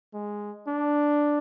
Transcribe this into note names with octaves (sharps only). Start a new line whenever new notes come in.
G#3
D4